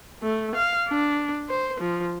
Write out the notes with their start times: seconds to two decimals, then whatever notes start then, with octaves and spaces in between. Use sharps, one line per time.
0.23 A3
0.56 F5
0.88 D4
1.49 C5
1.80 F3